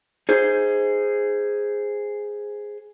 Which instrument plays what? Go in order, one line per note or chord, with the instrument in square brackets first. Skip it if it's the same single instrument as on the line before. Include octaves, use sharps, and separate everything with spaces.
[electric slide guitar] G#4 C5